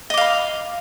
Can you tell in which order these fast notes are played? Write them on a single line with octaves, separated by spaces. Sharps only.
D#5 D6 F5 B5